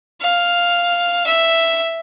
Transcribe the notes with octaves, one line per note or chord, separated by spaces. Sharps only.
F5
E5